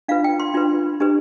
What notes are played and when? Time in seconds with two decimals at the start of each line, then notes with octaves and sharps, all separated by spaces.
0.08 D4 F4 B4 F5
0.24 G5
0.40 C6
0.54 D4 F4 B4
1.00 D4 G4 B4